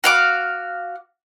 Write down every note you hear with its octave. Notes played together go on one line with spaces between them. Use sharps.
F#4 F5 D6